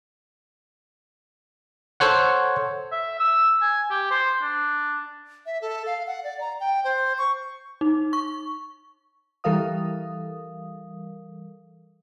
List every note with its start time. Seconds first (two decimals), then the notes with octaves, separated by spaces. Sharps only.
2.00 A4 C5 C#5 F#5
2.92 E5
3.19 E6
3.62 G#5
3.91 G4
4.11 C5
4.42 D4
5.46 E5
5.62 A4
5.86 F5
6.07 F#5
6.24 D5
6.41 A#5
6.60 G5
6.84 C5
7.18 C#6
7.81 D#4
8.13 C#6
9.44 E3 G3 A4 A#4 F5 D#6